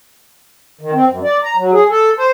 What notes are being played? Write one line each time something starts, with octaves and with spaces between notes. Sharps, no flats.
D#3
C4
F#2
D5
A#5
F#3
G#4
A4
C5